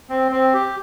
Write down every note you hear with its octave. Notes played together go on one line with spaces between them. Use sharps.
C4
C4
G4